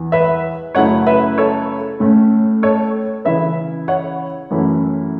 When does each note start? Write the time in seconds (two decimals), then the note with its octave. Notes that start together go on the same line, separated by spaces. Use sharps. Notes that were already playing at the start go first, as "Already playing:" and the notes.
Already playing: E2 E3 E4
0.12 B4 E5
0.75 F#2 C#3 A3 E4 C#5 F#5
1.07 B4 E5
1.38 A4 C#5
2.00 A2 A3 C#4
2.63 A4 C#5
3.25 C#3 E3 C#4 E4 B4 E5
3.88 C#5 F#5
4.50 F#2 E3 A3 C#4 E4